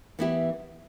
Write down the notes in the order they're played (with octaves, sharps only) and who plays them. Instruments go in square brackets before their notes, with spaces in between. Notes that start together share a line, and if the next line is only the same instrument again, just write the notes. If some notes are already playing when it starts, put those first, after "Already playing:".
[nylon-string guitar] E3 B3 E4 G4